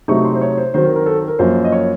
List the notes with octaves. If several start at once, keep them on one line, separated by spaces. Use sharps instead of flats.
C3 F#3 A3 D#4 C#6
C6
C5
C#5
C5
D#3 F#3 C4 C5
A#4
A#4
A4
A#4
F#2 F3 A#3 C5
D#5
C#5